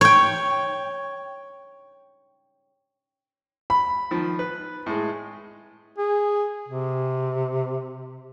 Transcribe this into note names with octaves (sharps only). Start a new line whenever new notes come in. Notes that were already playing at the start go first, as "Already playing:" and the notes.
C#5 G5
B5
D#3 F3
B4
A2 G#3
G#4
C3